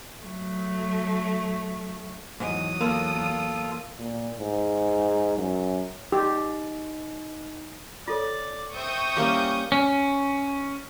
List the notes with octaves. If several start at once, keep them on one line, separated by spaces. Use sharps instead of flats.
F#3 A3
E2 G#2 F#3 D#6
A#3 F4 A4
A#2
G#2
F#2
D#4 G4
F4 A4 C#5 D5
C4 E5 C#6 D#6 G6
G3 A#3 C#4 E4 D6
C#4